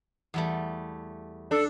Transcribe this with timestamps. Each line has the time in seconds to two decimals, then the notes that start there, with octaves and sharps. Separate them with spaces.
0.34 E2 G3 A3
1.51 D4 A4